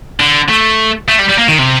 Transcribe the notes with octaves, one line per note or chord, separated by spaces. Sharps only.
D3
A3
A3
G3
G3
A#3
D#3
C3